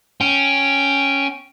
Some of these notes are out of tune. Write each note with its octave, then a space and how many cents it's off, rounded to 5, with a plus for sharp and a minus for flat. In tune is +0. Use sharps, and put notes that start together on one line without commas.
C#4 +0 G5 +0